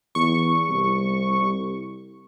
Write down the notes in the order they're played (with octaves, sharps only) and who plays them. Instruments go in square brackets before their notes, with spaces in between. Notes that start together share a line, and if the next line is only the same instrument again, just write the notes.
[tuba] E2 [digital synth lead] C#6
[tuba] C2